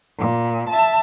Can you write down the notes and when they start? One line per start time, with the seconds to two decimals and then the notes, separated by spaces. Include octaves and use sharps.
0.17 A#2
0.70 E5 A5